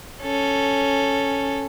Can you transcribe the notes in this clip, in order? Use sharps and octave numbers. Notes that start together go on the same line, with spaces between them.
C#4 A4